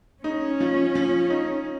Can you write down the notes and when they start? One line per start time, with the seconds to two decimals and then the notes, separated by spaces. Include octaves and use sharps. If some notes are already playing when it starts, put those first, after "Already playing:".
0.24 C#4 D#4
0.60 F3
0.95 F3
1.30 D#4